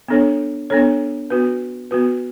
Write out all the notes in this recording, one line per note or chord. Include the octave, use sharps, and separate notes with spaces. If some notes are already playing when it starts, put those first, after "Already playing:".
B3 D4 A4 C#5
B3 D4 A4 C#5
B3 F#4 B4
B3 F#4 B4